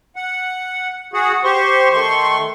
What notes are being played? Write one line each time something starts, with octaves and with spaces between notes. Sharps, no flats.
F#5
F#4 G#4 F#5
G4 C5 C6 C#6
D#3 A3 C6 C#6